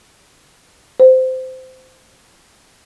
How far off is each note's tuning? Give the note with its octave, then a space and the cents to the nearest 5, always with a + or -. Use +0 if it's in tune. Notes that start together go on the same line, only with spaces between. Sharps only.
C5 -20